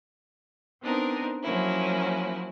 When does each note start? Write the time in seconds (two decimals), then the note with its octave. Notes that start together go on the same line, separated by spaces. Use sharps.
0.81 B3 C4 D4 D#4 A#4
1.43 F3 F#3 A#3 C#4 E4